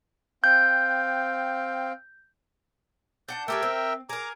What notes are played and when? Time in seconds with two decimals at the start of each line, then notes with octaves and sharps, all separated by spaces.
0.44 C4 F5 G5 G6
3.28 D4 F#5 A5 G6
3.48 A3 G4 G#4 A#4 E5 G5
3.63 C4
4.09 G#4 A#4 A#5 D6